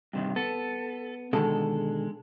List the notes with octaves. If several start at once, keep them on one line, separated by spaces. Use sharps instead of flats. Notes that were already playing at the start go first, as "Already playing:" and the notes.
G2 C3 D#3
B3 A4
B2 D3 D#3 G#3 A4